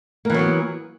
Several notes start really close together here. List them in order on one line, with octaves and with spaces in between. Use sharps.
A#3 E3 F#3 B3